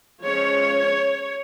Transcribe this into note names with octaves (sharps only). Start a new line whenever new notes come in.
F3 G#3 C#4 C#5